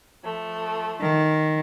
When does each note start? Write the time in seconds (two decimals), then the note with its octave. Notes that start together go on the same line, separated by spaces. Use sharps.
0.24 F3 A3
1.00 D#3